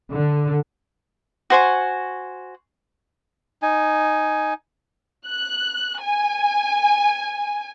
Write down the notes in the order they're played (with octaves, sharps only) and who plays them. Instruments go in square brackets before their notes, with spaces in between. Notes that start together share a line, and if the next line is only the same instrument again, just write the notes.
[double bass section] D3
[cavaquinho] F#4 C5 G#5 C#6
[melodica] D#4 G#5
[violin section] F#6
G#5